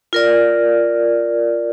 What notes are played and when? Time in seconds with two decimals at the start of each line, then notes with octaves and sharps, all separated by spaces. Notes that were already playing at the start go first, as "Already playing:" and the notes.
0.13 F4 A#4 D5